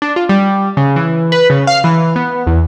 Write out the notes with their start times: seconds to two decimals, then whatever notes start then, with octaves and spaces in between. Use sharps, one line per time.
0.02 D4
0.16 F4
0.29 G3
0.77 C#3
0.96 E3
1.32 B4
1.50 C#3
1.67 F5
1.84 E3
2.16 B3
2.47 E2